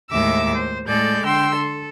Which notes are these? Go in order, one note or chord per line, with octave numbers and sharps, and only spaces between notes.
D#2 A2 G#3 E5 D6 E6
C5
A2 G#3 A4 D5 G6
D3 G5 C6 E6
A4